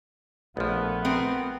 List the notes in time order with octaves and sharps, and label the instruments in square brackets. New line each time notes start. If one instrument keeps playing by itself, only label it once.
[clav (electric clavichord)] A#1 F3 [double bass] A3 [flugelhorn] B3
[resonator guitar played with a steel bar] C4 A#4